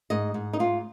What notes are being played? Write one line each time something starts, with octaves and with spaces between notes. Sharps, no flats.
G#2 D#5
G#2
D#4
G#2 F4